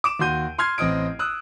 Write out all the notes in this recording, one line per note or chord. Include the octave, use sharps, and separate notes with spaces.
D6 D7 E7
D#2 F#4 C6 G6 D#7
C6 F6 G#6 C7
A1 C4 D#5 D#6 D7
D#6 E6 F#6